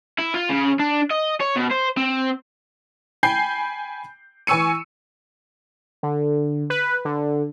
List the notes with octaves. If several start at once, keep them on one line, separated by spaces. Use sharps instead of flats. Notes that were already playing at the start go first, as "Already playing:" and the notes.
E4
F4
C#3
D4
D#5
C#5
B2
C5
C4
G5 G#5 B5 G6 C7
E3 G#5 C#6 E6 C#7 D#7
D3
B4
D3